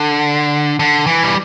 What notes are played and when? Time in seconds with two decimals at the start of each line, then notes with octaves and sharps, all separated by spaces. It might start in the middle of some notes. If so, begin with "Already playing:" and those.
Already playing: D3
0.79 D3
1.07 E3
1.23 G3